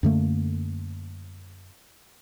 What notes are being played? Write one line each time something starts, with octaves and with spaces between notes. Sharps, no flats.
F#2 D3 A3 A#3